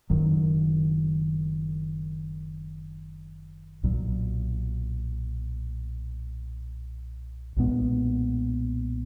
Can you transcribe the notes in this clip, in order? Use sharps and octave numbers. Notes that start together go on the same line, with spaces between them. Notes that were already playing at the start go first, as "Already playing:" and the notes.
F#1 F#2 D#3 F#3
B1 A#2 F#3
B1 A#2 G#3 B3